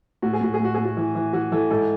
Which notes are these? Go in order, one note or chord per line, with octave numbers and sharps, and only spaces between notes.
A2 F#4
G#4
A2 F#4
G#4
A2 F#4
A2 G#4
F#4
E3
E3
E3 F#4
E3 A4
G#2 A4